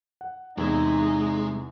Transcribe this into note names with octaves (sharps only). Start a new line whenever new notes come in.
F#5
E2 C3 G#3 D#4 E4 E5